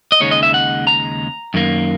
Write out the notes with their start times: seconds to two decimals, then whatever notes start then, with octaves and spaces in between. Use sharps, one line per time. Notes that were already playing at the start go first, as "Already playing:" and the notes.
0.12 D#5
0.20 D#2 C#3 G#3 D#4 C#5
0.31 D#5
0.43 E5
0.54 F#5
0.87 A#5
1.54 F#2 D#3 A#3